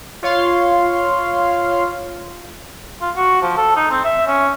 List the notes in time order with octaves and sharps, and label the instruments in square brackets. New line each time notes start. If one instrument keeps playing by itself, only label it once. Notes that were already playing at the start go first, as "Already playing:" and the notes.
[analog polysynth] F4 C#5 F5 C6
[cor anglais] F4
F#4
F3
A4
D#4
C4
E5
C#4